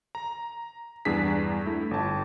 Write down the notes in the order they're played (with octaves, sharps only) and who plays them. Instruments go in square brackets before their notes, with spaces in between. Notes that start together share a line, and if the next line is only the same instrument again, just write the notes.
[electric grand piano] A#5
E2 G2 G3 D4 G#4 B6
A3 E4
G1 A5